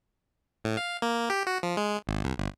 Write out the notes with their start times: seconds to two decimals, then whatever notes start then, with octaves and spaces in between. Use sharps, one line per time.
0.64 A2
0.77 F5
1.02 A#3
1.30 G4
1.47 F#4
1.63 F3
1.77 G#3
2.07 G#1
2.24 C2
2.38 G1